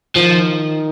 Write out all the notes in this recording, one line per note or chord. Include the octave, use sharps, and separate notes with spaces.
D#3 F3